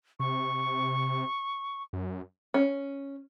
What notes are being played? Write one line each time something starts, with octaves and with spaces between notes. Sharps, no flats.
C3 C#6
F#2
C#4